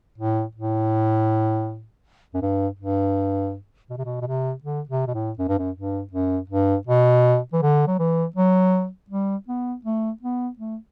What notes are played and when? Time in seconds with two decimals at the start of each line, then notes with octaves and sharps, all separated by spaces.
0.18 A2
0.55 A2
2.34 F#2
2.42 G2
2.79 G2
3.90 B2
3.98 C3
4.05 B2
4.22 B2
4.27 C3
4.64 D3
4.89 C3
5.07 B2
5.14 A2
5.39 F#2
5.49 G2
5.59 F#2
5.76 G2
6.13 F#2
6.50 G2
6.87 B2
7.53 E3
7.62 D3
7.88 F#3
7.99 E3
8.36 F#3
9.10 G3
9.48 B3
9.85 A3
10.23 B3
10.59 A3